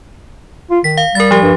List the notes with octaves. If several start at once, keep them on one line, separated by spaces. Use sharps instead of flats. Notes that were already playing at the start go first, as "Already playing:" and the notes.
F4
D#3 B6
F5
G3 A#4 A6
F3 G4
G2